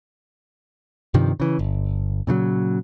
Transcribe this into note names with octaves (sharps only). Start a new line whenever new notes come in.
G2 C3 D#3 F3
C#3 E3
G1
A#2 C#3 E3 F#3